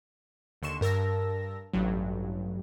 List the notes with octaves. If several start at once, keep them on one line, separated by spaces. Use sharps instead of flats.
D#2 D3 C6 C#6 E7
G2 A#4 A5 E6 A#6
A1 G2 F#3